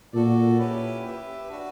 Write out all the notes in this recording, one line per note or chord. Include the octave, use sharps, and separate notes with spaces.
A#2 F#4 A4 D5
C#4 E4 G4 B4
G4 B4 E5
D4 F#4 B4